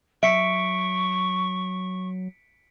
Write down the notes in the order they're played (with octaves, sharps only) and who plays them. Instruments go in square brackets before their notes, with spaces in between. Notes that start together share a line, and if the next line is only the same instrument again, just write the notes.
[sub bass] F#3 [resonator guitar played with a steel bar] E5 [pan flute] C#6 [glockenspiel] B6 C#7 D7